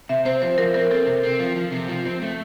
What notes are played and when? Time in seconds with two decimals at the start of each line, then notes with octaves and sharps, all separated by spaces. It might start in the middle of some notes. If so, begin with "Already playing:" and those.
0.09 C3 E5
0.25 C4 C5
0.42 F3 C5
0.58 F3 A#4
0.74 C4 A#4
0.91 C4 A4
1.07 C3
1.23 C4
1.40 F3
1.56 F3
1.72 C3
1.88 F3
2.05 C4
2.22 A3